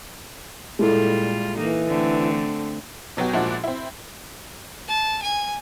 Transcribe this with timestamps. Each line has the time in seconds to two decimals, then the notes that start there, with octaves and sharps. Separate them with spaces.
0.79 A#2 G3 G#3 E4 F4 A4
1.56 E3 A#3 D#4 A4
1.88 D3 A3 C4
3.17 B2 F#3 B3 F#4 G4
3.34 A#2 F3 G#3 D4 E4 F#4
3.64 C4 E4
4.88 A5
5.22 G#5